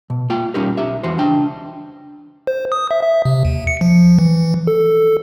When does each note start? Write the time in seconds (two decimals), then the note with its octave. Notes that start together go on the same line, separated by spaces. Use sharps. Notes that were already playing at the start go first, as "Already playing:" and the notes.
0.10 B2
0.30 A#3 F4 G5
0.54 G3 C#4 D#4 G4 A#4
0.77 B1 G4 E5
1.03 E2 E3 F#4 C5
1.18 C#2 D4 G5
2.47 C5
2.72 D#6
2.91 E5
3.03 E5
3.25 C3
3.45 D#2
3.67 C#7
3.81 F3
4.19 E3
4.67 A4